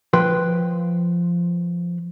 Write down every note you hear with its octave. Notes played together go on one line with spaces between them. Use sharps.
F3 B4 G5 C6